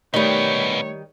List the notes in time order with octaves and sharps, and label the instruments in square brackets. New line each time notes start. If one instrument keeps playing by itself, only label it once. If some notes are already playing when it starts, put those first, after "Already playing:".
[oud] D#3 G3 [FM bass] A3 [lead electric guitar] B3 D#4 [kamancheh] C#5